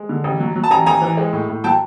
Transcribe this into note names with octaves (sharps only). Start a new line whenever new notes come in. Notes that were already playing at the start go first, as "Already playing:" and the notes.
Already playing: G#3
D3
A1
F#3
F#3
A5
A1 G#5 A#5
A1 G#5 A#5
E3
G#3
A2
A2
F#3 G5 A5